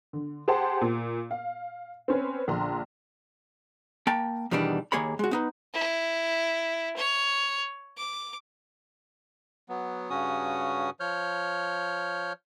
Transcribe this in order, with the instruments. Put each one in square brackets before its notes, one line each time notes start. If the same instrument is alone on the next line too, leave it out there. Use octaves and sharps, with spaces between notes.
[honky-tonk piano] D3
G4 G#4 C5 F#5 A5
A#2
F5
C4 C#4 B4
A#1 D3 A#5 C6
[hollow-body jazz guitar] A#3 G5 A5
E2 B2 D#3 E3 G3 D4
D#2 A#3 G#4 C#5 B5
G#3 F#4
B3 D#4 B4
[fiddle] E4
C#5
D6
[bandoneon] F#3 B3
G2 C#3 C#4 F#4 D#6
F3 C#5 F6 G6